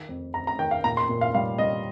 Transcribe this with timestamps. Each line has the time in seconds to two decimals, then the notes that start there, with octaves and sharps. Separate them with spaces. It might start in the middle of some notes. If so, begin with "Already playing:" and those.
Already playing: D#3
0.09 F2
0.34 F2 A#5
0.47 A#5
0.59 D#3 G5
0.71 F5
0.84 A#2 A#5
0.97 C6
1.09 A#2
1.21 F5
1.35 G3 F5
1.58 G3 D#5